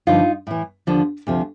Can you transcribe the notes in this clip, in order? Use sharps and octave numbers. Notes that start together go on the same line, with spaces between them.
G2 D3 F3 D#4 F4
A2 E3
D#2 D3 F3
D2 C3 F3